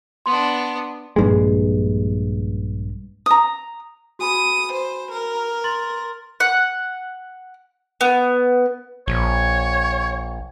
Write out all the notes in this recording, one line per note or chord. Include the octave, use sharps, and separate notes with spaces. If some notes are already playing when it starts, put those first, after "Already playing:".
B3 D4 C6
A#1 G2 G#3
A#5 D#6
F#4 G#5 B5 D#6
C5
A#4
C6 A6 F#7
F#5
B3
A#1 C#5